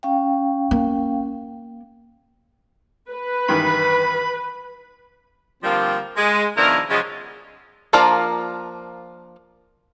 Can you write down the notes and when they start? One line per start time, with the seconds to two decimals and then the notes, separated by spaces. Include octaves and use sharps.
0.03 C#4 F5 G5
0.71 A#3
3.11 B4
3.49 G2 D#3 E3 B5
5.63 D3 F3 G3 A#3 C4
6.17 G#3
6.57 B2 D#3 F3 D4 E4 A#4
6.90 C#3 F3 F#3 G#3
7.93 F3 A#3 D4 F4 A#4